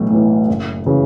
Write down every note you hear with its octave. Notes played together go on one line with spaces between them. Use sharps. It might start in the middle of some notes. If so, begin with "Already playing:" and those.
Already playing: B1 A2 E3
A2 E3
F#1
C#3 E3